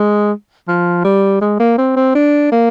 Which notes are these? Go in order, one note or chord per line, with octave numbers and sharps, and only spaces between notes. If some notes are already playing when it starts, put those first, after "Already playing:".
Already playing: G#3
F3
G3
G#3
A#3
C4
C4
D4
A#3